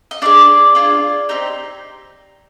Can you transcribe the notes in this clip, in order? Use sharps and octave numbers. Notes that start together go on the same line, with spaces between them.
D#5
D4 F4 G#4 D5
D4 F4 G#4
C4 D#4 G4